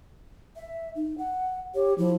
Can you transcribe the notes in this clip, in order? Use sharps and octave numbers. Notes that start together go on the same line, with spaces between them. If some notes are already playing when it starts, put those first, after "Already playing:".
E5
D#4
F#5
G4 C#5
F3 E4